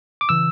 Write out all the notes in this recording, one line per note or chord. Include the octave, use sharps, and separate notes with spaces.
D6
C#3 E3 E6